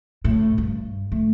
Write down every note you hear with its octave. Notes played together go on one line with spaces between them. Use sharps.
A2
G2
A3